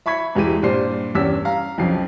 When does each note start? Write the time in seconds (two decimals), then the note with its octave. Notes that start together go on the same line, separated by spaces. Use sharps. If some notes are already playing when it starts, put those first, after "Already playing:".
0.06 E5 B5 C#6 G#6 B6
0.35 E1 E3 G#3 G4 D#7
0.62 G2 A#2 G3 C5 C7
1.15 E2 G2 C#4 G4 E6 B6
1.45 F5 A#5
1.78 B1 F2 C#3 F3 C7